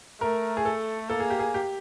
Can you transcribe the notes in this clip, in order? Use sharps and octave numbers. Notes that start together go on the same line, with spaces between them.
A3 A#4
G#4
A4
A#3 A4
G#4
G4
G#4
G4